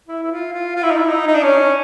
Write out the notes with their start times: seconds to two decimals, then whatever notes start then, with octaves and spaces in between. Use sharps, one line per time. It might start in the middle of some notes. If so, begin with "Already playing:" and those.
0.08 E4
0.23 E4
0.31 F4
0.53 F4
0.76 F4
0.83 E4
0.91 D#4
0.98 E4
1.09 D#4
1.27 D#4
1.35 D4
1.43 C#4